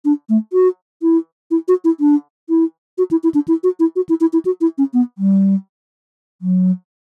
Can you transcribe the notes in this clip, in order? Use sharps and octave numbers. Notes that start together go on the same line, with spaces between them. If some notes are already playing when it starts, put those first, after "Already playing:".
D4
A3
F#4
E4
E4
F#4
E4
D4
E4
F#4
E4
E4
D4
E4
F#4
E4
F#4
E4
E4
E4
F#4
E4
C#4
B3
G3
F#3